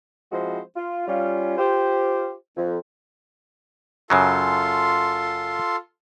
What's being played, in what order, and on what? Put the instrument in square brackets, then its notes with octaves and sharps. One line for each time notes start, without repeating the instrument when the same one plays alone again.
[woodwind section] F3 G#3 C4 E4 F#4 C5
F4
G3 C#4 F4
F4 G4 C5
F2
[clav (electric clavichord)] F#2 C#3 F#3 [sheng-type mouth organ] F4 A4 C6